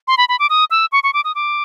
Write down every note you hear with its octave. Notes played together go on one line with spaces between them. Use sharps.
C6
B5
B5
D6
D#6
E6
C#6
C#6
D6
D#6
D6